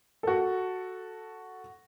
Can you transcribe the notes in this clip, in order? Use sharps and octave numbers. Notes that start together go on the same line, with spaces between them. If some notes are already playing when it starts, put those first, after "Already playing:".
F#4 A4